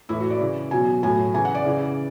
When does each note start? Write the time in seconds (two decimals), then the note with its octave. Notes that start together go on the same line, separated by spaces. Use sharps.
0.09 A2 E3 E4
0.20 F#4
0.30 D5
0.41 C#3 E3
0.71 B2 F#3 G#5
1.03 A2 F#3 G#5
1.34 C#3 E3 G#5
1.45 F#5
1.54 D5
1.65 C#3 E3